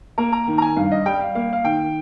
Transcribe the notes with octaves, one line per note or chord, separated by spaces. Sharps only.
A#3 A#5
A#5
D#3
A#5
G#5
G2 F5
D#5
G3 G5
F5
A#3 F5
F5
D#3 G5